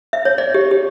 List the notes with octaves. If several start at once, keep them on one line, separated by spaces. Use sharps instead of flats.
E5
C#5
D5
G4
G4